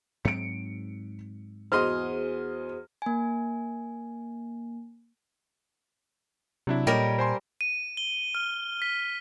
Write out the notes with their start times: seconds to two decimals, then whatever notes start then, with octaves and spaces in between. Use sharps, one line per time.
0.25 G#2 F#3 C4 C#7 D7
1.72 E2 F#4 G#4 C5 D#5 C6 F6
3.02 A#3 G#5
6.67 C3 F#3 D4 E4
6.87 A#2 G3 A#4 C#5 D#5 G5
7.18 C5 G#5 C6
7.61 D#7
7.97 G7
8.35 F6
8.82 B6